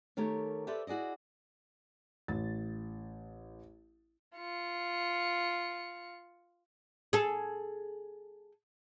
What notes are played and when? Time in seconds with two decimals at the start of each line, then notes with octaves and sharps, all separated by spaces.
0.17 D#3 A3 G4 A#4 C#5
0.67 G4 A4 B4 C5 D5 E5
0.87 E4 F#4 G#4 D5 D#5
2.28 A1 A6
4.37 F4 C#7
7.13 G#4 A4